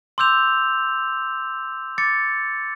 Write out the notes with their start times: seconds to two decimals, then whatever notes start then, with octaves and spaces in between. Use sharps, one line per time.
0.18 C6 D6 E6 G6 F7
1.98 D6 A6 C#7